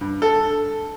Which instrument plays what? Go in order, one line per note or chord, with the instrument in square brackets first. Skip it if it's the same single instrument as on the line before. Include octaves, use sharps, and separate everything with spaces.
[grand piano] G2
A4